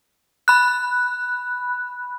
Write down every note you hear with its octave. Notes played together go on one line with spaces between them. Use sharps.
B5 F#6